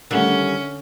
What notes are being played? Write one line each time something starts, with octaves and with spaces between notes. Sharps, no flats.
D3 D#3 G3 A3 C#4